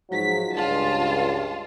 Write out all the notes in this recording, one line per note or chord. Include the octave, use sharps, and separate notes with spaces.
G#2 F3 F#3 B6
C#2 G2 F4 A5